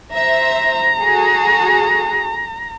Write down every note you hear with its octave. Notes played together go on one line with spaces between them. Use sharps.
C5 E5 A#5
F#4 G#4 A4